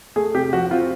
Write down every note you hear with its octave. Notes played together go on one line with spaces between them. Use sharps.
A3 G#4
C3 G4
F3 F#4
C4 F4